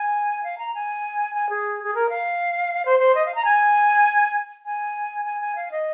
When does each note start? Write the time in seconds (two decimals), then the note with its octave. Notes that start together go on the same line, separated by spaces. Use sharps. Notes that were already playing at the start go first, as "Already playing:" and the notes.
Already playing: G#5
0.43 F5
0.58 A#5
0.75 G#5
1.35 G#5
1.49 G#4
1.84 G#4
1.95 A#4
2.09 F5
2.85 C5
2.99 C5
3.15 D#5
3.26 F5
3.35 A#5
3.45 G#5
4.66 G#5
5.25 G#5
5.41 G#5
5.56 F5
5.71 D#5